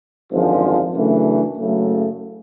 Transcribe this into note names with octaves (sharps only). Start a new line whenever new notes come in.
G#1 F#2 D3 F3 G#3
F#2 C#3 E3 A3 D4
F#1 F#2 C#3 F#3 A3